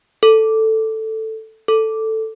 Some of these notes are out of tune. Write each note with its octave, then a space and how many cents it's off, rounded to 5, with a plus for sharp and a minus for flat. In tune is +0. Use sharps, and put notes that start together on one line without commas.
A4 +5
A4 +5